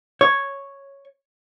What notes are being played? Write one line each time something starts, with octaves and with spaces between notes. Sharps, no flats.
C#5